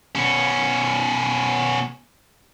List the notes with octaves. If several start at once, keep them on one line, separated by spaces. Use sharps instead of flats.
B2 C#4